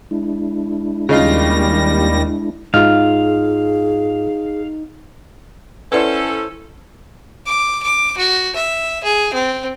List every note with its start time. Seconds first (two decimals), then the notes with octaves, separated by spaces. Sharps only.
0.11 G#3 D4 E4
1.09 D#2 C#3 G3 D#4 F4 A#6
2.74 G#2 D#4 F4 G#4 F5
5.92 C#4 E4 A4 B4 C5 D5 F#5 E6
7.46 D6
7.82 D6
8.17 F#4
8.56 E5
9.04 G#4
9.33 C4